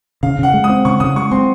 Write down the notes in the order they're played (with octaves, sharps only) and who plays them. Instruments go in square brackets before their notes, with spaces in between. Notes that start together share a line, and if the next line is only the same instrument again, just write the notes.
[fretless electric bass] C#3 [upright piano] F5
[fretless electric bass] C#3 [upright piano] F#5
[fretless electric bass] G#3
[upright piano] D#6
[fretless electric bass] C4
[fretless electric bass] C#3 [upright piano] C#6
[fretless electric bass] C#3 [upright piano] D#6
[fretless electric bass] G#3 [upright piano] C#6
[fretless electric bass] C4 [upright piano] C6